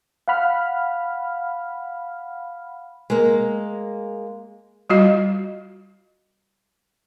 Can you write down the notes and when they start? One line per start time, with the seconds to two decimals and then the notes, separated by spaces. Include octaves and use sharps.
0.28 F5 F#5 B5 F6
3.10 G#3 A#3
4.90 G3 F4 F#4 D#5